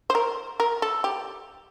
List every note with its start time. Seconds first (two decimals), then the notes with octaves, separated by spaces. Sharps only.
0.10 C5
0.15 A#4
0.60 A#4
0.82 A4
1.04 G4